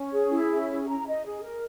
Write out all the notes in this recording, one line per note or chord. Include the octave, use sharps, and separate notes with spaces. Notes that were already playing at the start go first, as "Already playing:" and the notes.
Already playing: C#4
G#4
E4
C#4
G#4
A#5
D#5
G#4
A#4